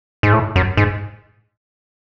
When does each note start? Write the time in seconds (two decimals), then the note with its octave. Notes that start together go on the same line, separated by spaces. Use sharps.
0.23 G#2
0.33 A2
0.56 F#2
0.77 G#2